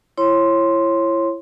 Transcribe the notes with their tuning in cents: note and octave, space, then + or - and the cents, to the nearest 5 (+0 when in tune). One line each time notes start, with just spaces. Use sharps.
E4 +30 C#5 -25 C6 +0